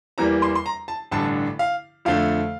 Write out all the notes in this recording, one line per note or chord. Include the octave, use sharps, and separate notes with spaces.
E2 E3 G3 A#3 A#5
C6
C6
A#5
A5
A1 G2 D3 A5
F5
F2 D3 A3 F5